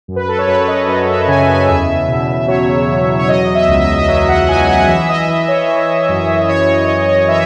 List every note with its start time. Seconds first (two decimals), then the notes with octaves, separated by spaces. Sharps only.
0.08 F#2
0.16 B4
0.28 A4
0.39 C#5
0.48 F#2 B4
0.68 D#5
0.88 F#2 D#5
1.02 D#5
1.09 E5
1.28 C#3 G#5
1.48 G#5
1.68 E2 E5
2.08 B2
2.48 F#3 C#5
2.88 E2
3.19 C#5
3.28 F#3 D#5
3.55 E5
3.69 C#2
3.82 E5
3.98 D#5
4.08 F#3 E5
4.28 F#5
4.48 F#3 G#5
4.69 F#5
4.88 E3 E5
5.09 D#5
5.28 E3 D#5
5.48 C#5
5.68 E3
6.09 F#2
6.49 E3 C#5
6.68 D#5
6.88 E3 D#5
7.08 D#5
7.28 E3 E5